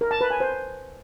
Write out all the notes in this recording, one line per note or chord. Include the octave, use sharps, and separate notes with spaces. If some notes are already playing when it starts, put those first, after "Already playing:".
A#4
A5
B4
G#5
C5